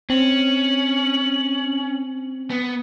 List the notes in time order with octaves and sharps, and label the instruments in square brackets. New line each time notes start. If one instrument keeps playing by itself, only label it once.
[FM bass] C4 [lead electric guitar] C#4 [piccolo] F#7
[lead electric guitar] B3